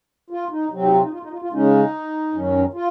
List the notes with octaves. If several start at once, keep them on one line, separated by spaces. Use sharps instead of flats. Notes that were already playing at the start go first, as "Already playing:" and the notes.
F4
D#4
C3 F#3 C4
D#4 F#4
F4
D#4
F4
D#4
F4
F4
C#3 G#3 C#4 D#4
F#2 D#3 F#3 C#4
F4